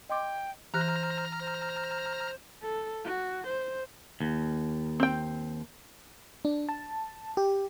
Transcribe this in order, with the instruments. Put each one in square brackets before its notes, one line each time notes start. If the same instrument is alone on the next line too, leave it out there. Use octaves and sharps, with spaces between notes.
[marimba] D#5 C6 D6 [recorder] G5
[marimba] E3 G4 F#6 [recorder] C5 [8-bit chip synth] A#5 F6 A#6
[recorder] C5
[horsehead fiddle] A4
F#4
C5
[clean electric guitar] D#2
[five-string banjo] C4 G5
[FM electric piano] D4
A5
G4